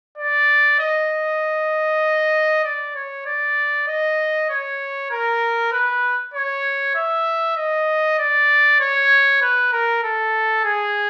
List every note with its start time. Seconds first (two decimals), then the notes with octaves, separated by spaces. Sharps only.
0.18 D5
0.80 D#5
2.65 D5
2.96 C#5
3.26 D5
3.88 D#5
4.50 C#5
5.11 A#4
5.72 B4
6.34 C#5
6.95 E5
7.57 D#5
8.19 D5
8.80 C#5
9.42 B4
9.73 A#4
10.03 A4
10.65 G#4